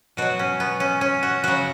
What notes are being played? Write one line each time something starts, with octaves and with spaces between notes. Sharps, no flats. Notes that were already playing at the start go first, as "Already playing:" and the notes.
B2 F#3 F#4
C#4
B3
C#4
C#4
F#4
C#3 F#3 F#4